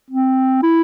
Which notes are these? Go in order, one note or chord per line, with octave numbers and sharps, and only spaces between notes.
C4
E4